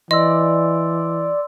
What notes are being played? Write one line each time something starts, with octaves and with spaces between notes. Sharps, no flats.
E3 D5 D#5 C6 E6